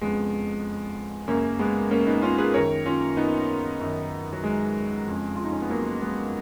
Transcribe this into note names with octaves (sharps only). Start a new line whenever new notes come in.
F2 C#3 G#3 B3
F#2 C#3 A#3 C#4
G#3 B3
A#3 C#4
B3 D#4
C#4 F4
G#4 B4
F#2 D#3 A#4 C#5
C#4 F4
B3 D#4
F#2 D#3
F#3
G#3
F2 C#3
F4
D#4
C#4
B3
F#3 A#3
G#3 B3